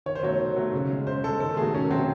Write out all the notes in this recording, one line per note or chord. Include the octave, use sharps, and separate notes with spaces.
D#3 C#5
C5
F#3 A3 C#5
D#3
F#3 A3
C#3
G#3
C#3 C5
G#3 A4
D#3 A4
F#3 A3 G#4
D#3 C#4
F#3 A3 C4